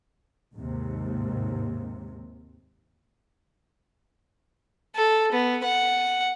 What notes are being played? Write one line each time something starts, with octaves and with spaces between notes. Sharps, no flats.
D#2 G#2 C3
A4
B3
F#5